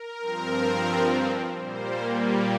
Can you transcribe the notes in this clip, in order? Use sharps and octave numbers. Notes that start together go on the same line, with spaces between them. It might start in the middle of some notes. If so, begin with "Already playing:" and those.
Already playing: A#4
G2 F3 C4
A#2 G3 A#3 C5
G4